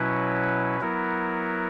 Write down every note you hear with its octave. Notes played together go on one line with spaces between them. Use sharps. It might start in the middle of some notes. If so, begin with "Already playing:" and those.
Already playing: B2 F#3 C#4 E4 B4
F#3 B3 E4 A#4